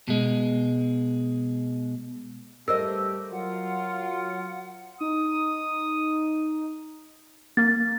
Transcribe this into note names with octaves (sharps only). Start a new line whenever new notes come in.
B2 G#3
G3 A3 G4 A#4 C5 D#5 E6
F#3 F4 F#5
D#4 D#6
A#3 A6